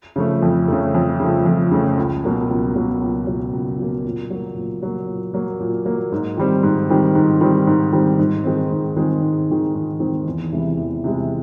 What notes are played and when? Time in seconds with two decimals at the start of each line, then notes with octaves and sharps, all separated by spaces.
0.16 C#3 F3 A3
0.42 F2
0.68 C#3 F3 A3
0.95 F2
1.20 C#3 F3 A3
1.46 F2
1.71 C#3 F3 A3
1.97 C#2
2.24 B2 F#3 A#3
2.49 C#2
2.76 B2 F#3 A#3
3.01 C#2
3.27 B2 F#3 A#3
3.53 C#2
3.78 B2 F#3 A#3
4.04 A#2
4.30 F#3 A#3
4.56 A#2
4.83 F#3 A#3
5.08 A#2
5.34 F#3 A#3
5.60 A#2
5.85 F#3 A#3
6.12 G#2
6.37 D#3 G3 C4
6.63 G#2
6.89 D#3 G3 C4
7.15 G#2
7.41 D#3 G3 C4
7.67 G#2
7.92 D#3 G3 C4
8.19 G#2
8.44 D#3 G#3 C4
8.71 G#2
8.96 D#3 G#3 C4
9.22 G#2
9.48 D#3 G#3 C4
9.75 G#2
10.00 D#3 G#3 C4
10.26 E2
10.52 C3 E3 G#3
10.77 E2
11.04 C3 E3 G#3